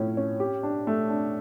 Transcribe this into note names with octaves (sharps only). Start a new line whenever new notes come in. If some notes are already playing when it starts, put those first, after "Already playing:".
Already playing: A2 F3 C#4
C#4
G4
D4
A3
D4